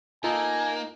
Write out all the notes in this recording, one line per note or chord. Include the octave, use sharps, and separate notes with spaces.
A#3 D#4 F4 A4 G#5